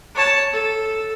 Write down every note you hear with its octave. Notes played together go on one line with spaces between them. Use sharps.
C#5 A5
A4